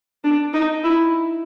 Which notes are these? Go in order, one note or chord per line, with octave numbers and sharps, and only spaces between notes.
D4
D#4
E4